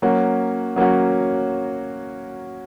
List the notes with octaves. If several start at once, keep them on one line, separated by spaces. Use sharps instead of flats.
F#3 A#3 C#4 F#4
F#3 A#3 C#4 F#4